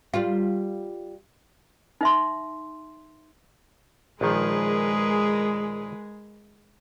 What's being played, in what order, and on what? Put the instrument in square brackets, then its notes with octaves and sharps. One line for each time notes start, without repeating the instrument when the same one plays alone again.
[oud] G3 F4
[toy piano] D#4 E5 C6
[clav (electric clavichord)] A#1 D#3 F3 [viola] G#3 [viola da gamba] G#4 A#4 B4